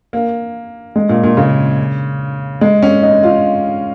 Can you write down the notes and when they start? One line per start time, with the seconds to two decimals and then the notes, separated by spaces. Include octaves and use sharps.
0.13 A#3
0.96 G#3
1.09 A#2
1.23 A#2
1.37 C#3
2.61 G#3
2.83 C#4
3.03 D#4
3.23 F4